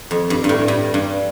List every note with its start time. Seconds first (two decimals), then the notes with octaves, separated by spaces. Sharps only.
0.11 F2
0.30 G2
0.44 G2
0.49 A2
0.68 G2
0.94 G2